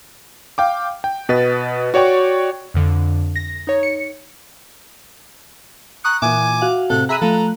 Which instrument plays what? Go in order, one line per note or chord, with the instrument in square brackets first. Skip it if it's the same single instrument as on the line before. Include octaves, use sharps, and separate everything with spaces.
[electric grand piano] F5 G5 D6
G5
B2 B4 D#5 A6
F#4 C#5 D5 G5 C#6
[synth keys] F2 D3
A#6
D#4 C#5
C#7
[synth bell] A#5 C#6 D#6 [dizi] F#6
[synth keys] A#2 E3 [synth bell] E5 [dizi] G#5 [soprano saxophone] D6
[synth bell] F#4 F5 F#5
[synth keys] A2 C3 [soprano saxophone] A4 [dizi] F#6
[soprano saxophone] G#4 [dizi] E5 [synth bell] A#5 B5 D#7 [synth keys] F#6
[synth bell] F3 A3 [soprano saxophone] A4 [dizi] A#5